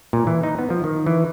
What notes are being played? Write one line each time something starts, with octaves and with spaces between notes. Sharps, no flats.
A#2
E3
D#4
B3
F3
D#3
E3